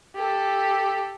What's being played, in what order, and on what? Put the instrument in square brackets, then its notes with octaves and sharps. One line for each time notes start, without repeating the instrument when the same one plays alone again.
[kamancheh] G4 A4